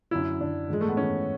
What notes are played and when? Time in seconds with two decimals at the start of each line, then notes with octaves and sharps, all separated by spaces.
0.11 F#2 D3 E4
0.40 F#2 D3 D4
0.68 G#2 E3 G#3
0.81 A3
0.89 B3
0.97 G#2 E3 C#4